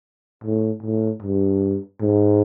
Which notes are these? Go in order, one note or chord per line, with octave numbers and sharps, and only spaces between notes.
A2
A2
G2
G#2